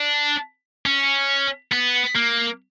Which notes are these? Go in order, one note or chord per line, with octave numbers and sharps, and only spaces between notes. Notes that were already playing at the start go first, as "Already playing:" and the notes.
Already playing: D4
C#4
B3
A#3